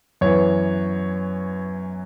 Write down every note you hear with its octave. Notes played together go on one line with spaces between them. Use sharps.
F#2 E3 B3 C#5